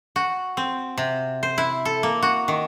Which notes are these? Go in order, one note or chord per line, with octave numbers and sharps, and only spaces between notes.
F#4
C4
C3
C5
E4
A4
A#3
F#4
D#3